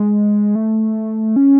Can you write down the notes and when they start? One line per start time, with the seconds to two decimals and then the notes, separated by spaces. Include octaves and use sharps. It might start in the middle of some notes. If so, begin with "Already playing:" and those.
Already playing: G#3
0.55 A3
1.36 C#4